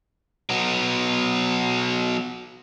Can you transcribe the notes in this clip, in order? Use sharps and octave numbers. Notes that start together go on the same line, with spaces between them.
F#3 B3